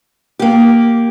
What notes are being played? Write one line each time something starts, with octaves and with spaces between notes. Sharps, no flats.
A#3 G4